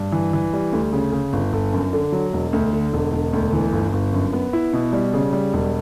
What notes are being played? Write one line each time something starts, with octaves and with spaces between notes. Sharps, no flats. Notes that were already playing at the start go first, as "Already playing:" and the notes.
Already playing: G2
E3
E3
G3
D2
C#3
C#3
G1
G1
F#2
D3
F#3
E1
D2
D3
E1
E1
D2
E3
G1
G1
F#2
B3
E4
B2
G3
C#3
G3
E1